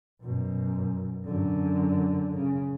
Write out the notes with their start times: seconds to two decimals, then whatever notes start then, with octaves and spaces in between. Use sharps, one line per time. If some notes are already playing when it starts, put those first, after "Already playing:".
0.21 F#2 B2
1.24 F#2 D3
2.35 C#3